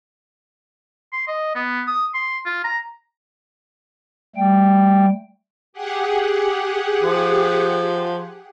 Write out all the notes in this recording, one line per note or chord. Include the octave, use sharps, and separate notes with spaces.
C6
D#5
B3
D#6
C6
F4
A#5
G3 A3 G5
G4 G#4 F#5
F3